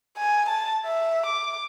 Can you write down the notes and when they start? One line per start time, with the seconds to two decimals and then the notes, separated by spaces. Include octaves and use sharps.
0.17 G#5
0.49 A5
0.85 E5
1.26 D6